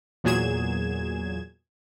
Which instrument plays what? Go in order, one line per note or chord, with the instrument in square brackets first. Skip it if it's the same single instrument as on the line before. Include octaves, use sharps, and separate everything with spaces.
[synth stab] E2 A#2 F#3 G#4 G#6 E7